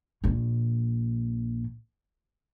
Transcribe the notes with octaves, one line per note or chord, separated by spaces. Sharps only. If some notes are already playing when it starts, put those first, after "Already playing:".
A#1 A#2